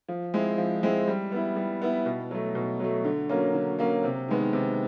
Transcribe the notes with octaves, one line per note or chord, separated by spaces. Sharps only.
F3
G#3 C4 E4
F3
G#3 C4 E4
G3
B3 E4
G3
B3 E4
B2
F#3 A3
B2
F#3 A3
D3
F#3 A#3 C#4
D3
F#3 A#3 C#4
C3
D#3 G#3 B3
C3